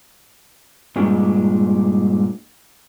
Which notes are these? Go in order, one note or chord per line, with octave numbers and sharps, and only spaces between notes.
G2 A#2 G#3 D4